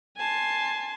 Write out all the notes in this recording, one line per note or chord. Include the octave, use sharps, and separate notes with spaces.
G#5 A5 C6